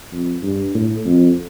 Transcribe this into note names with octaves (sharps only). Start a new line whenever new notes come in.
F2
G2
A2
F2